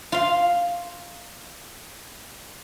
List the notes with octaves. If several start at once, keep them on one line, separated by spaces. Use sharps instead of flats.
F4 F5